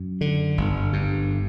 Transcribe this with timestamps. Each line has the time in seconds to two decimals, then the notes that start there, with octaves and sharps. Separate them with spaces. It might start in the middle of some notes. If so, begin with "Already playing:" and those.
Already playing: F#2
0.21 D3
0.58 G1
0.93 G2